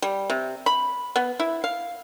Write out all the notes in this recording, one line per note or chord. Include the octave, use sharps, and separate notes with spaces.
G3
C3
B5
B3
E4
F5